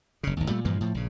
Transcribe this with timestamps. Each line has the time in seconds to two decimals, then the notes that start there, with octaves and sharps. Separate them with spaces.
0.23 F#1 C#3
0.37 G#1 D#2
0.48 A#2 G3 A3
0.65 G2 A#2 E3 F3
0.81 A2 F3
0.94 A#1 C#3